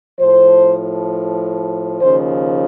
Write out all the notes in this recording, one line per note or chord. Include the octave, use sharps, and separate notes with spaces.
A2 F3 C5
D#2 C#3 F3 C5